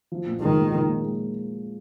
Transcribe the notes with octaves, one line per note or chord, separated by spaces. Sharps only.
F3
A#2
D#3 G#3
A#2
F3
A#2
G#3